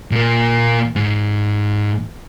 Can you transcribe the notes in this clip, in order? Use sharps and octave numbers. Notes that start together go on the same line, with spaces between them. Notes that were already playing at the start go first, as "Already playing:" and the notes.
A#2 A#3
G#2